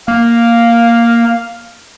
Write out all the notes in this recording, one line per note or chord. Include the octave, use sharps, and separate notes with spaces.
A#3 F5